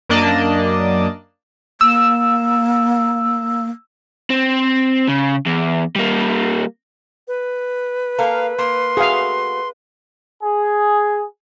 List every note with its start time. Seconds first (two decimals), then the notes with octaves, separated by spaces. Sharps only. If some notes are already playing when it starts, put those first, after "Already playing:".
0.09 F#2 A#3 D4 D5 D#5 A5
1.81 A#3 E6
4.30 C4
5.08 C#3
5.46 E2
5.96 G3 A#3
7.28 B4
8.18 A#3 A4 A#4 F5
8.58 A#3 C6
8.97 A3 A#3 F#4 G#4 F5
10.42 G#4